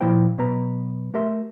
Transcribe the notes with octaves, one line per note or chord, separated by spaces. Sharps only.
A#2 F3 A#3 E4 C5 G5
B2 F#3 B3 B4 A#5
A3 G4 A#4 E5 C6